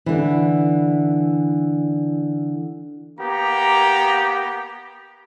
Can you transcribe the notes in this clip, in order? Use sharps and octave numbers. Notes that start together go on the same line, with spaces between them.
D3 E3
A#3 B3 G4 A#5